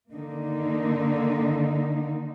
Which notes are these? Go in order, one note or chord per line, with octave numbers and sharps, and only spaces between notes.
D3 D#3 A#3 D#4